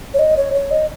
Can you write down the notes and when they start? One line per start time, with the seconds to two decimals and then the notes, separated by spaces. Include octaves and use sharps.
0.14 C#5
0.19 D#5
0.37 C#5
0.54 C#5
0.71 D#5